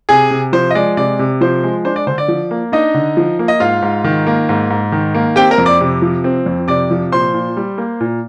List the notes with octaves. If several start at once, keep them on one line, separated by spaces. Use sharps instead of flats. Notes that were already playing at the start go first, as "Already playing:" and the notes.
C3 G#4 G#5
C3
F3 C5
D#5
G#3 D5
C3 D5
C3
F3 C5
G#3
D4 C5
D5
D3 C5
D5
F3
A#3
D4 D#4 D#5
D3
F3
A#3
D#5
G#2 F4 F5
G#2
D#3
A#3
G#2
G#2
D#3
A#3
C4 G4 G5
A#4 A#5
F2
D5 D6
C3
F3
C4
F2
C3 D5 D6
F3
A#2 C5 C6
A#2
G3
A#3
A#2